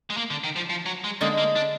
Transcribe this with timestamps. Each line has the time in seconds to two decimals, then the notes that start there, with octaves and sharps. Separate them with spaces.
0.10 G#3
0.17 A#3
0.30 D3
0.44 D#3
0.56 F3
0.69 F3
0.86 F#3
1.04 G#3
1.21 D3 G#3 A#3 D#4
1.38 A#3
1.56 D4